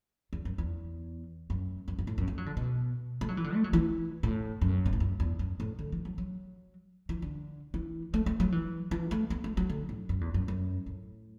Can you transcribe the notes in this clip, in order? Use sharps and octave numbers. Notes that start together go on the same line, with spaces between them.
E2
F#2
E2
F#2
F#2
F#2
A2
F#2
A3
F#3
D3
B2
A3
F#3
E3
D3
A3
F#3
E3
A2
F#2
B2
A2
F#2
E2
F#2
A2
D3
E3
F#3
F#3
E3
D3
E3
A3
A3
F#3
E3
E3
A3
B3
A3
F#3
D3
A2
F#2
E2
F#2
F#2
A2